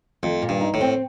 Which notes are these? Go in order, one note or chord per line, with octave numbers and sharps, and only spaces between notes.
F2 A3
A#2
G2
D#4
A2
C4